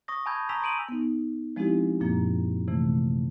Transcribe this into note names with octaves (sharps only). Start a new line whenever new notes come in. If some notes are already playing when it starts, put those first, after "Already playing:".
C#6 D#6 A#6
G#5 A5 B5 E6 G6 G#6
G#5 A#5 C#6 E6 B6 F7
C6 D#6 D7 D#7 F#7
B3 D#4
F3 G#3 C4 D#4 E4 G4
F#2 A#2 F3 A#3
C3 E3 A3